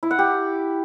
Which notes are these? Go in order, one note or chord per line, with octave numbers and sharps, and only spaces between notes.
E4
F#5
G4